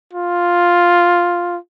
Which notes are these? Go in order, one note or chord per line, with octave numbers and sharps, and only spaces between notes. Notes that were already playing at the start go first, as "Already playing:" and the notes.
F4